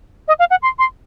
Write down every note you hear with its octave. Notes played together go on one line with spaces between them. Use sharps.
D#5
F5
F#5
C6
C6